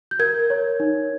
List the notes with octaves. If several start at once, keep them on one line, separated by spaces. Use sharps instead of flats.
G6
A#4 G#6
C#5
D#4